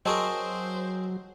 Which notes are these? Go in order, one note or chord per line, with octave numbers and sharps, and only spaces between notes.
F#3 C4 G#4 A#4 C5 D#5 A5 C#6